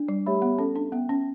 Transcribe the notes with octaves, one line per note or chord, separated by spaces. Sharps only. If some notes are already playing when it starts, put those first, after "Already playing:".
Already playing: D4
G3
A3 G4 C#5 E5 B5
B3
C#4 A4
D4
B3 E5 G5
C#4